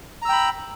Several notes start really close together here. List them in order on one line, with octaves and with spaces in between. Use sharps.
A#5 E6 G5 B5